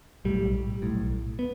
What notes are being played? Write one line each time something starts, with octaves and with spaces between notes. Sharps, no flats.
B1 A2 G3
B1 A2
B3